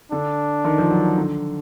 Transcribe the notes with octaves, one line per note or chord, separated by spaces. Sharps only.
D3 D4
D#3
F3
F#3
D3